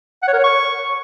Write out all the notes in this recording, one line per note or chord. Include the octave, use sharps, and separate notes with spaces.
F#5
C#5
A#4
C#5
C#6